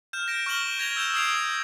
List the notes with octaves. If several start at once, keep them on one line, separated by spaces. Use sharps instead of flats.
F6 G6 E7
G6 A#6 D7
C#6 F6 E7 F#7 G7
G6 G#6 A#6 F7 G7
E6 G6 E7 G7
D#6 E6 G#6 C7 D7 F7